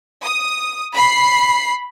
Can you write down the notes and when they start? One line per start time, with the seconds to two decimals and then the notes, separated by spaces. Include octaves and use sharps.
0.23 D#6
0.93 B5 C7